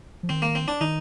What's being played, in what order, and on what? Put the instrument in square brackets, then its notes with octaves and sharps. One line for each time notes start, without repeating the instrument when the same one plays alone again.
[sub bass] F3
[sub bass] D#3 [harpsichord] C4
[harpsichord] A#3
C4
D4
[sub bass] D#3 [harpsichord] D#4